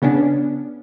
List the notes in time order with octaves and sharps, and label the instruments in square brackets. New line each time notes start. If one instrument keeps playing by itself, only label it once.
[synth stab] C#3 B3 C#4 D4